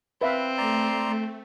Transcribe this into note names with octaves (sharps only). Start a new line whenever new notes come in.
C4 B4 E5 F5
A3 D5 A#5 C6